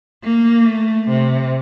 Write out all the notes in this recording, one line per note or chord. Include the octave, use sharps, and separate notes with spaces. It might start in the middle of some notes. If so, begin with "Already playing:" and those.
A#3
A3
C3